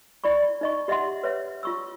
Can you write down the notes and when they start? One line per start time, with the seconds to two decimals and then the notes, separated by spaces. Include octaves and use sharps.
0.24 E4 D5 B5 C#6
0.61 D#4 D#5 C#6
0.88 G4 D#5 E5 F#5 C6
1.23 B4 C#5 E5
1.63 F4 C#6 E6